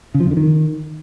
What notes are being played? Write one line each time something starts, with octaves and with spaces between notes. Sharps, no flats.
C#3
F3
F2
D3
D#3